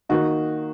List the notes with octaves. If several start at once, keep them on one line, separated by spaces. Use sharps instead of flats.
D#3 A#3 D#4 F#4